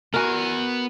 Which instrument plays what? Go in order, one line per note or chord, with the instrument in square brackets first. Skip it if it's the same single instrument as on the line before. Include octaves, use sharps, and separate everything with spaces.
[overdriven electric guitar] B3 G#5 [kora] F#4 A#4